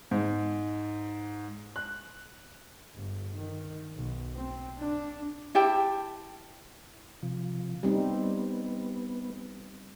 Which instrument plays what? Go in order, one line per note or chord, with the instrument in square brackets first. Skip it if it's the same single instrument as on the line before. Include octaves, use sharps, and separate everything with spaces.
[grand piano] G#2
F#6
[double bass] G1
D#3
B1
C4
D4
[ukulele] E4 G4 G5 A5
[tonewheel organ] C3 F3
[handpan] G3 C4 D#4 [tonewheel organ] B3